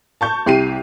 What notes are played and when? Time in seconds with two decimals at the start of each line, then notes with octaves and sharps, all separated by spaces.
0.21 A5 C#6 G6
0.46 C2 G4 C7 D#7